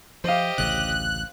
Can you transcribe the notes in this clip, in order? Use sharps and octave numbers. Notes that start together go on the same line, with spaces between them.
F3 G4 C5 D#5 F5
A1 D2 C#3 F#6